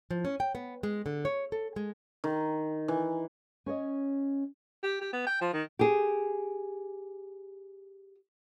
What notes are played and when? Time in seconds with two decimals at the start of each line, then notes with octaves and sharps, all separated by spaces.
0.11 F3
0.25 C#4
0.40 G5
0.55 B3
0.83 G#3
1.06 D3
1.25 C#5
1.52 A4
1.76 G#3
2.24 D#3
2.88 E3
3.66 C#4 C#5 D#5
4.83 G4
5.01 G4
5.13 B3
5.27 G5
5.41 F3
5.53 D#3
5.79 G4 G#4